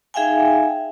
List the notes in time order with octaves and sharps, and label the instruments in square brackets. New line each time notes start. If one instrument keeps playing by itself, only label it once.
[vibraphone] D#4 G#4 E5 F5 G5 G#5